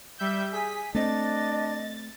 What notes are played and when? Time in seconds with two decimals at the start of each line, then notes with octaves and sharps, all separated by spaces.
0.18 G3 E5 G6
0.53 G#4 G#5 B6
0.95 A3 C4 D4 D#5 A6